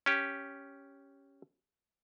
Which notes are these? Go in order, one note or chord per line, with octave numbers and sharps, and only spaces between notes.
C#4 G4